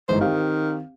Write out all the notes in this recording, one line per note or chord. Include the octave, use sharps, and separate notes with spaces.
G1 G#2 E3 C5
D#3 C4 G4 F5